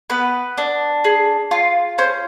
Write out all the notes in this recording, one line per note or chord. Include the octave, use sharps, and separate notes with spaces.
B3 B4
D4
G#4
F4
C#4 C5